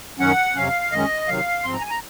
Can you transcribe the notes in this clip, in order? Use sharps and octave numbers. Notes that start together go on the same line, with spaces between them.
F#2 D#3 F#3 C#4 F#5
F2 C3 F#3 C#4 F5
F#2 D#3 G#3 C#4 D#5
C3 D#3 F#3 F5
G#2 F3 C4 C6
A#5
G#5
A#5